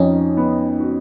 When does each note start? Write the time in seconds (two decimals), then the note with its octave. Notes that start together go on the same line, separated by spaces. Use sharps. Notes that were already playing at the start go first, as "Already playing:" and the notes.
Already playing: F2 F3 C#4 D#4
0.37 B3
0.80 F#4